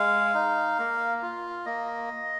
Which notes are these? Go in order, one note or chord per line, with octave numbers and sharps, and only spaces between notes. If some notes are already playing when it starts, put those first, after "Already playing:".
Already playing: G#3 F5
D#4
A#3
F4
A#3 D#5